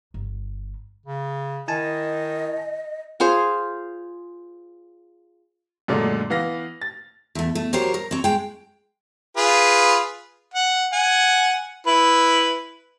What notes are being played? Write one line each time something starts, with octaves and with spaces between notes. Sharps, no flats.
G1
C#3
D#3 E4 D#5 G#5 A5
F4 G#4 C5 F5
F#2 A#2 D3 G#3 A3 D4
E3 B3 F5 A#6
A6
E2 A3
A3
F#3 G4 A#4 C5 C#5
A#4
C4 C#5
G#3 G5
F4 G#4 B4
F#5
F#5 G#5
E4 B4